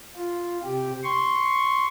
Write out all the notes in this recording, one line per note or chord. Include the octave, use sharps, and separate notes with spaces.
F4
C3 G4
C6 C#6